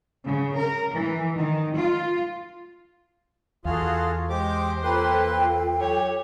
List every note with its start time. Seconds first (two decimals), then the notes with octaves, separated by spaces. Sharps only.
0.27 C#3
0.57 A#4
0.93 E3
1.37 D#3
1.77 F4
3.65 E2 F4 F#4 G#4 A4 F5
4.29 G#3 G4 C5 D6
4.83 A#3 F4 A4 B4 G5 C6
5.80 F#3 G4 C#5